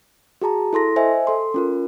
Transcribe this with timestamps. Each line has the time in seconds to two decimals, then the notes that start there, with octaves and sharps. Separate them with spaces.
0.42 F#4 G#4 A5 A#5
0.73 E4 A4 C6 A#6
0.96 C5 D#5 E5 G#5
1.27 A4 C6
1.54 C#4 F4 A#4